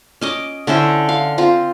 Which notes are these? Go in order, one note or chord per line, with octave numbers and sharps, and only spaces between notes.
C#4 D#5 D6
D3 C#4 E4 C5
F5
C4 F4